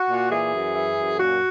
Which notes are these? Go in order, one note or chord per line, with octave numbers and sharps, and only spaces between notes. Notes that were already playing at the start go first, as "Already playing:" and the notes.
Already playing: F#4
A#2
E3 G#4
F#2
E3
F#2
A#2 F#4